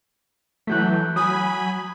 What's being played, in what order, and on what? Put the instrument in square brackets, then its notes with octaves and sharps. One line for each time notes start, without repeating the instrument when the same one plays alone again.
[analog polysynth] E3 F#3 A3 [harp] F#6 G6 B6
[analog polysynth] F#3 G#5 B5 [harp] D#6